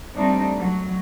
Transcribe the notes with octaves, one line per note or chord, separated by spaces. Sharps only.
G3 A3 C4 D4 D#4
F#3